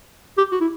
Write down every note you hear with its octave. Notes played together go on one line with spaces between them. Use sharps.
G4
F#4
E4